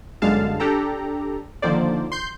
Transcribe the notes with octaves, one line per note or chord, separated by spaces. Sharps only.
G1 F#2 D3 G#3 F5 A5
D4 G4 A4 A#5
D3 D#3 F3 A#3 C5 D5
C6 G6